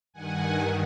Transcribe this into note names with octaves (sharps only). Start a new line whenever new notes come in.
G2 D#3 F#5 G#5